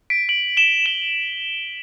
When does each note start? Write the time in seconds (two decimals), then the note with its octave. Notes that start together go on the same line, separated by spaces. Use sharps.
0.10 B6 D7
0.29 D7 F#7
0.57 E7 G7
0.86 E7 G7